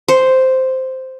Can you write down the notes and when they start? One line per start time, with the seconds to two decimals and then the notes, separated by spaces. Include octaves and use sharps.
0.08 C5